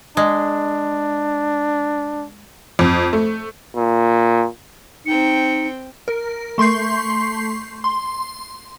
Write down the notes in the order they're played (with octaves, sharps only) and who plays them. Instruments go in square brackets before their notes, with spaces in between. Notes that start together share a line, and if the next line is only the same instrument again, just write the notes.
[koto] G#3 [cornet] D4
[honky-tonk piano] F2
A3
[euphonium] A#2
[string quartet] C4 G5 [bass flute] D#4 [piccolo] C#7
[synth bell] A#4
A3 C6 C#6 G6 C7
C6